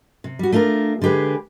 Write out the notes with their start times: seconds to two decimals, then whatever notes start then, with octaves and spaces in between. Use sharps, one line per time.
0.24 C3
0.39 G3 F#4
0.52 A3 D4 F4 G#4 A#4
1.02 D3 G#3 G4 G#4 B4